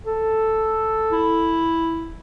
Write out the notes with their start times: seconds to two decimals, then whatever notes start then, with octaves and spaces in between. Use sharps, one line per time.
0.06 A4
1.12 E4